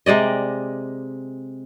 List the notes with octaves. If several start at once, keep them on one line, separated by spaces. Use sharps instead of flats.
C3 G#3 D5 D#5